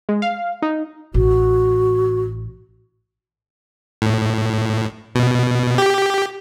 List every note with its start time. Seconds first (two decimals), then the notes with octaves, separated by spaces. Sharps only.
0.09 G#3
0.22 F5
0.62 D#4
1.14 A1 F#4
4.02 A2
5.15 B2
5.78 G4